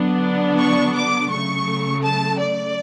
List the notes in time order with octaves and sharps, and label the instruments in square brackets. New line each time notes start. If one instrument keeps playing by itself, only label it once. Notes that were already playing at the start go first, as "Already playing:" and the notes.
Already playing: [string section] D3 F#3 B3 D4
C#6
D6
C#3 F#3 A3 C#6
A5
D5